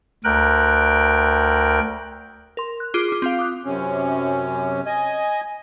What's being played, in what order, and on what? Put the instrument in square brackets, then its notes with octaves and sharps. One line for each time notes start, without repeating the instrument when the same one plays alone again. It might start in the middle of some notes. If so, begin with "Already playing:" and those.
[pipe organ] D2 A#4 G5 F#6
[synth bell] A#4 C6
F#6
F4 G#4 D6 D7 D#7 G7
F4 D6
C4 F4 F5
D6 D#6 F#6
[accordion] F#2 C3 C#4
D#5 G#5